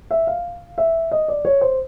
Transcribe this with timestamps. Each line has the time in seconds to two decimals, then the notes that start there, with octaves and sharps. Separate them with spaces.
0.11 E5
0.27 F5
0.78 E5
1.12 D#5
1.28 D5
1.45 C#5
1.61 C5